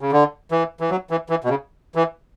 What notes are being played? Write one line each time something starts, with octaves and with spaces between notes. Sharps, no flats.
C#3
D3
E3
E3
F#3
E3
E3
B2
C#3
E3